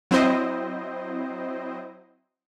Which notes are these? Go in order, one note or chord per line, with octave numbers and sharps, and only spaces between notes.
F#3 C4 E4 C5 D#5